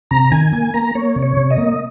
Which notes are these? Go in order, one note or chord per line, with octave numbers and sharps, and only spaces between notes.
C3 A#5
D#3 G#5
A#3 G#5
A#3 A#5
A#3 C#5
C3
C#5
C3
D#5
A#3